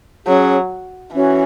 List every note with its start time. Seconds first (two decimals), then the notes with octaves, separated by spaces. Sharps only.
0.27 F#3 C#4 G#4 C#5
1.14 E3 C#4 F#4 C#5